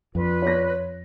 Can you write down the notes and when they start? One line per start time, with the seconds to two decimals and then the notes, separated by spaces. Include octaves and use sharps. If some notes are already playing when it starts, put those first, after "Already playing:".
0.15 F2 D4 F4 B4
0.42 C#5 A#6